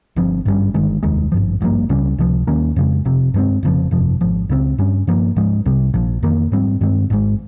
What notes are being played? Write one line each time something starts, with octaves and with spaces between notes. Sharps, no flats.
G1 G2 F3 C4
G#1 G2 G3 C#4
G1 G2 D#3 G#3
F1 D#2 D#3 G#3
G#1 G2 F3
G#1 G2 F3 A#3
C#2 C#3 G3 C#4
C#2 C3 F3
D#2 D#3 A#3 C#4
F2 C#3 G#3
F1 F2 C3
G2 F3 G#3 C4
F1 F2 C#3 F3
G1 F2 C3 F3
G#1 G#2 F3
C#2 C#3 G#3 C4
G2 G3 C#4
G2 F3 A#3
G#2 F3 G#3
C2 C3 G3
A#1 A#2 F3
F2 D#3 A#3
G#2 G3 C4
G2 D#3 G#3 C4
G#1 G#2 D#3 G#3